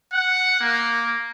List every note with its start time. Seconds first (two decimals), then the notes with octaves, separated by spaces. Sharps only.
0.13 F#5
0.60 A#3